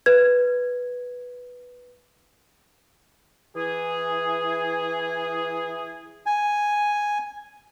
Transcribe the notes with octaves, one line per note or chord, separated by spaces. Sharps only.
B4 G#6
E3 G#4
G#5